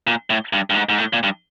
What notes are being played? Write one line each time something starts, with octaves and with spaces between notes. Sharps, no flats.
A#2
A2
G2
G2
G#2
G#2
A2
A#2
G2